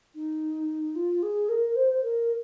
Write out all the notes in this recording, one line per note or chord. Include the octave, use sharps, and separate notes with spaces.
D#4
F4
G#4
A#4
C5
A#4